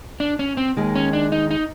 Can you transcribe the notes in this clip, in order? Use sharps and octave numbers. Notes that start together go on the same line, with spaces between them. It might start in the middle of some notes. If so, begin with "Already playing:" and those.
D4
C#4
C4
D#2 D#3 G#3
C#4
D4
D#4
D#4